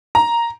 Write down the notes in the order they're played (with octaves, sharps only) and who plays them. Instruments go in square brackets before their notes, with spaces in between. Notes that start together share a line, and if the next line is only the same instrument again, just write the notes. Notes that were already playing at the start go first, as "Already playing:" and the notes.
[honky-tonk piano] A#5